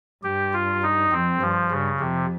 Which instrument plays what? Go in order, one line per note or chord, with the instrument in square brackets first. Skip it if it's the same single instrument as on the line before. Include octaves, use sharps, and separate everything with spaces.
[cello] G2 [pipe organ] G4
[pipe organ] F4
D#4
[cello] F2 [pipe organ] C4
[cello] G2 [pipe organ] F3
[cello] G2 [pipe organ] C#3
[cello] F2 [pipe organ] C3